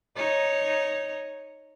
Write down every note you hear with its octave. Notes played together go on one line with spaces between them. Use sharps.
D#4 C#5 D#5